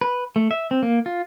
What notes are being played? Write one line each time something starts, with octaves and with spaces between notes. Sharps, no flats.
B4
A3
E5
C4
A#3
F4